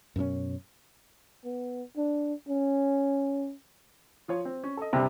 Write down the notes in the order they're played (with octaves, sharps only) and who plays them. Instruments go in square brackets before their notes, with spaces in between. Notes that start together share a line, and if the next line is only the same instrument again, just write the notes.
[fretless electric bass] F#2 B2 C4 C#4
[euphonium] B3
D4
C#4
[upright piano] F3 F4 C#5
C4
C#4
A4 D#5
[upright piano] C2 G2 [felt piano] C3